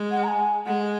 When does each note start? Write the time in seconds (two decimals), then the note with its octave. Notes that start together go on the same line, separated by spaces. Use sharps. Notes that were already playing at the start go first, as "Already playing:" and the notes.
Already playing: G#3
0.11 F#5
0.24 A#5
0.28 G#5
0.66 G#3 F#5